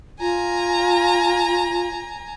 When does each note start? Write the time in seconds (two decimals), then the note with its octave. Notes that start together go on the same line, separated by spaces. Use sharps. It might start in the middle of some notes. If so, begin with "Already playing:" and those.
0.20 F4 G#5 A#5